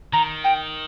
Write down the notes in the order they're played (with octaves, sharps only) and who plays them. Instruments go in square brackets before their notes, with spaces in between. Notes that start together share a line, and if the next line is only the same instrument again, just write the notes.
[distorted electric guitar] D#3 [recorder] A#5
[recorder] G5